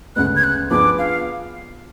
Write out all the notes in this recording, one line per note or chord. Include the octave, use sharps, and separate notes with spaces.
D2 C#3 G#3 B3 F#6
G#6
F#6
F3 B3 D4 G#4 B4 D6
F5